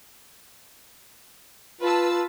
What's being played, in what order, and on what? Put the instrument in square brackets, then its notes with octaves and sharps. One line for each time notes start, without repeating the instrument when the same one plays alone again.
[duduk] F4 [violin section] B4 A5 E6